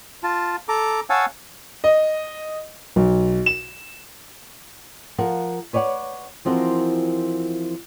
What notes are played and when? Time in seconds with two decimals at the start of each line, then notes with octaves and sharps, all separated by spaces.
0.23 F4 A5
0.69 A4 A#5 D6
1.10 C#5 F5 F#5 G#5 A5 E6
1.84 D#5
2.96 B1
3.46 E7
5.18 F3 A#4 F5 F#5
5.73 B4 C#5 D5 F5 F#5
6.45 E3 F3 C4 F#4 A#4